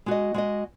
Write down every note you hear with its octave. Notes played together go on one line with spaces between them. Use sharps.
G#3 F#4 D#5
G#3 F#4 D#5